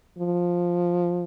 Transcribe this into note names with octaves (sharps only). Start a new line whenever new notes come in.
F3